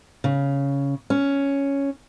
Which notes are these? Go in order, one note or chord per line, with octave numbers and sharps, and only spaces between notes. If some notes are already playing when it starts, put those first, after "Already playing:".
C#3
C#4